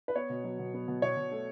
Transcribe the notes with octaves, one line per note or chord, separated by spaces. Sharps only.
B4
B3 C#5
B2
F#3
B2
B3
B2
B2 C#5
B2
A3